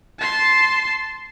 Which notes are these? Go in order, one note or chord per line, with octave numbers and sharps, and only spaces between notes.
A5 C6